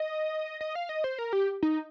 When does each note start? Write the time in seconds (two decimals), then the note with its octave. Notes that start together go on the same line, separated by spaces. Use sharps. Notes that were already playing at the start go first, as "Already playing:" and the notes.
Already playing: D#5
0.61 D#5
0.75 F5
0.89 D#5
1.04 C5
1.19 A#4
1.33 G4
1.63 D#4